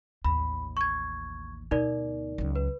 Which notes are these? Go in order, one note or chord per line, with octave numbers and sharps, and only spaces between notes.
A1 D#2 B5
C#6 G#6
D2 B2 D#4 A#4 D5
C#2 F#3
B4